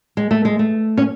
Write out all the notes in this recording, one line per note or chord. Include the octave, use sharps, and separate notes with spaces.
G#3
A3
G#3
A3
C#4